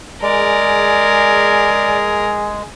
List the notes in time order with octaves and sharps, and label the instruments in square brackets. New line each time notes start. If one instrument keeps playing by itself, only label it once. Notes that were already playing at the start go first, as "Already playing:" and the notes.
[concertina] G#3 [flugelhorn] G#4 [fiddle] A#4 [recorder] D5